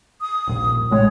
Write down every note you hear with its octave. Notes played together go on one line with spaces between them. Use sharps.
D#6
D#1 A#1
A#1 A2 G#3 C#5